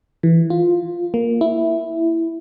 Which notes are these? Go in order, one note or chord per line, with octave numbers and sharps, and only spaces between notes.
E3
F4
A#3
E4